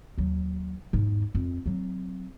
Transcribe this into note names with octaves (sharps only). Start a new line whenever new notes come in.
D#2 F#3
E2 G#2
F2
F#3 C4